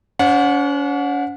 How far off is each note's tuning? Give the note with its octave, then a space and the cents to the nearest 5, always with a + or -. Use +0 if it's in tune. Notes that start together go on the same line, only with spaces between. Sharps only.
C#4 +40 C5 +0 F#5 -25